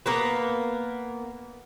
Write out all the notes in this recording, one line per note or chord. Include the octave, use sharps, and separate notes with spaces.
A#3 B3 A#4 B4